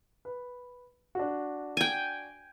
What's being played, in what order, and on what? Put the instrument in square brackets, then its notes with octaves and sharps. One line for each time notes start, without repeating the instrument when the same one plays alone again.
[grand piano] B4
D4 F#4
[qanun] G5 G#5